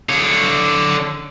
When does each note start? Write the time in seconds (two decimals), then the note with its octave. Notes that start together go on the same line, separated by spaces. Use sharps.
0.09 D3 C#5